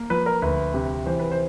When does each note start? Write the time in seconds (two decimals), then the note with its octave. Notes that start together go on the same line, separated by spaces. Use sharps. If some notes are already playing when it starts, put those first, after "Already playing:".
Already playing: A#3
0.10 F3 B4
0.26 A#4
0.42 D2 B4
0.74 C3
1.06 E3 C5
1.19 B4
1.32 C5